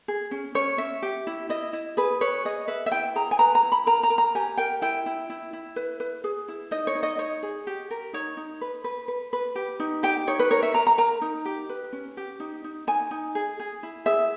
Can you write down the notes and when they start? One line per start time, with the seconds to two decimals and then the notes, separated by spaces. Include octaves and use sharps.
0.08 G#4
0.31 C#4
0.55 C#4 C#5
0.78 C#4 E5
1.02 G4
1.27 E4
1.49 E4 D#5
1.73 E4
1.97 G#4 B4
2.21 B4 C#5
2.45 G#4 D#5
2.68 B4 E5
2.86 E5
2.92 E4 G5
3.15 G#4 A#5
3.31 G#5
3.39 B4 A#5
3.55 A#5
3.63 E4
3.72 B5
3.87 A#4 A#5
4.03 A#5
4.10 A#4
4.18 A#5
4.35 G4 G#5
4.58 A#4 G5
4.82 E4 G5
5.06 E4
5.30 E4
5.53 E4
5.76 B4
6.00 B4
6.24 G#4
6.48 E4
6.71 D#4 D#5
6.87 C#5
6.95 D#4
7.03 D#5
7.18 D#4 C#5
7.43 G#4
7.67 G4
7.91 A#4
8.13 D#4 C#5
8.37 D#4
8.61 B4
8.84 B4
9.08 B4
9.33 B4
9.55 G4
9.80 D#4
10.03 G4 G5
10.27 D#4 C#5
10.39 B4
10.51 A#4 C#5
10.62 E5
10.74 A#4 A#5
10.87 A#5
10.98 A#4 A#5
11.21 D#4
11.45 G4
11.69 B4
11.93 C#4
12.17 G4
12.40 D#4
12.64 D#4
12.87 D#4 G#5
13.11 D#4
13.35 G#4
13.60 G#4
13.83 E4
14.06 G#4 E5